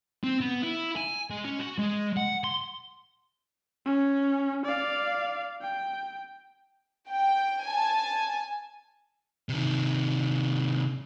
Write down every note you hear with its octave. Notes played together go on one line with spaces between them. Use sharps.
C4
B3
E4
G#5
G#3
C#4
F#4
G#3
F#5
C6
C#4
D5 F5
G5
G5
G#5 A5
C3 D#3